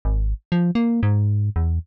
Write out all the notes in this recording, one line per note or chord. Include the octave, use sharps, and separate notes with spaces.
G#1
F3
A#3
G#2
E2